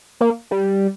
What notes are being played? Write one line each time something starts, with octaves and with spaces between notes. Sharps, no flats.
A#3
G3